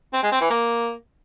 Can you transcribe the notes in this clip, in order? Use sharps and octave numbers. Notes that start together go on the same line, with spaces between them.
C4
G#3
C4
E3
A#3